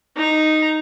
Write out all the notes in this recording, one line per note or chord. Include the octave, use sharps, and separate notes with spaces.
D#4 A#5